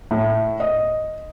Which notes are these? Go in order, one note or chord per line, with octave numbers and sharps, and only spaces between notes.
A2
D#5